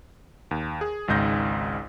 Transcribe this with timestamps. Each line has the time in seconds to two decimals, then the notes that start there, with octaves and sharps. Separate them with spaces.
0.51 D#2
0.81 G#4
1.08 G#1 C#2 G#2 G6 A#6